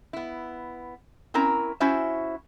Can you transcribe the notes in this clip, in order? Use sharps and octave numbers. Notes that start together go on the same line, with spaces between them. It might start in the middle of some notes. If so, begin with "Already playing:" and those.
B3 E4
C4 C#4 E4 A#4 A#5
C#4 E4 F#4 C5 E5